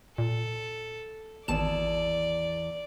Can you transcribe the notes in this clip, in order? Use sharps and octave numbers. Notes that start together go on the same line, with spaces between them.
A#2 A4
G#1 E2 D5 A5 E7